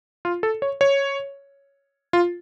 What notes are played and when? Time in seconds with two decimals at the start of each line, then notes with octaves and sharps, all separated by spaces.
0.25 F4
0.43 A4
0.62 C#5
0.81 C#5
2.13 F4